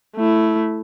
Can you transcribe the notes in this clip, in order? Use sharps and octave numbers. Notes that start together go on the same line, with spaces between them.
A3 E4